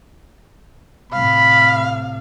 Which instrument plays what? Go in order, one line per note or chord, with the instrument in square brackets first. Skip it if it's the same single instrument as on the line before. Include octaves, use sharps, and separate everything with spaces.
[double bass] A2 C3 [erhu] F5 [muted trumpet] B5